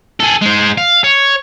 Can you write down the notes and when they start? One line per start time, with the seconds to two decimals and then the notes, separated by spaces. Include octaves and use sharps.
0.20 G#4 A4
0.42 G#3 C5
0.78 F5
1.04 C#5